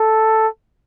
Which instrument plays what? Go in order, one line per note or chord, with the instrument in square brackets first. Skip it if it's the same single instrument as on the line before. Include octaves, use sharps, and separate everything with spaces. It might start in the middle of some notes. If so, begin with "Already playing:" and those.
Already playing: [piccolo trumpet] A4